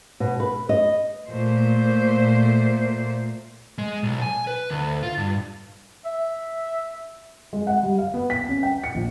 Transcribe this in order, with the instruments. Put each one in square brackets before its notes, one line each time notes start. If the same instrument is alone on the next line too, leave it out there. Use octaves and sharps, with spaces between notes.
[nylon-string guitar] B2
B4
D#5
[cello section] A#2 A3 C5
[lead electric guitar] G#3
B1
G#5
B4
D2
F4
G2
[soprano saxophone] E5
[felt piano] G#3
F#5
G3
F5
B3
B6
C#4
G5
C#7
A#1